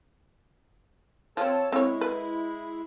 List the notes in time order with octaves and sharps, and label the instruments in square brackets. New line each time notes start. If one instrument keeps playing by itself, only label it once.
[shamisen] F3 C4 [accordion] A4 C#5 A5
[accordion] G#3 E4 [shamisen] C4 C#5
[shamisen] B4